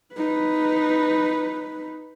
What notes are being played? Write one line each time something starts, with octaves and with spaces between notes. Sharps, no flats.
D#4 B4